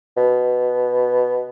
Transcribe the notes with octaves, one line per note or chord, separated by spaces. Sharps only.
B2